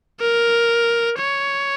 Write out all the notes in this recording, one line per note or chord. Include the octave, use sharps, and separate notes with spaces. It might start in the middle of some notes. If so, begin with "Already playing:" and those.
A#4
C#5